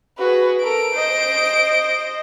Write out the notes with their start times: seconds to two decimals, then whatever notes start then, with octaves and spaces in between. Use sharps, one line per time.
0.18 F#4 G#4 B4
0.63 A4 A#4 D7
0.93 C5 D#5